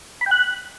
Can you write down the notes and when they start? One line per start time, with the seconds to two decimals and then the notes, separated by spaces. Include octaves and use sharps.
0.21 B5
0.26 G5
0.31 F#6